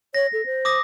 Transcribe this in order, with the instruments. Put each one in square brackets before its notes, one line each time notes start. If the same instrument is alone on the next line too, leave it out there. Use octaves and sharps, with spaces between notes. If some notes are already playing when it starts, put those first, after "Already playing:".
[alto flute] C#5 [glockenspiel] A#6
[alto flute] A4
C5
[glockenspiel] D6 D#6 A#6